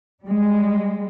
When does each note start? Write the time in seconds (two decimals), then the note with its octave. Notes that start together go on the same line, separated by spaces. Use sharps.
0.22 G3 G#3